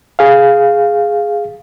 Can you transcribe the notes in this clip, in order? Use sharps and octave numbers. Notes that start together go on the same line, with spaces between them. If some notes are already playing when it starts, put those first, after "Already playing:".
G#4 F5